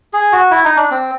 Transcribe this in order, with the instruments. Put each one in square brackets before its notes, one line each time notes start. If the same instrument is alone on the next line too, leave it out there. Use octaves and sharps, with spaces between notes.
[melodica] G#4
F#4
E4
D#4
D4
C4